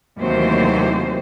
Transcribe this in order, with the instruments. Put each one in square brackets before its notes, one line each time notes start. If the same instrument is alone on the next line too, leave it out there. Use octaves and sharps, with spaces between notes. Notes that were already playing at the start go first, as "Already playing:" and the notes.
[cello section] D#2 C3 E3 F#3 A3 C5